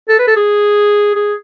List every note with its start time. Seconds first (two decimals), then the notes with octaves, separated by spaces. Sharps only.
0.09 A4
0.19 B4
0.27 A4
0.36 G#4
1.15 G#4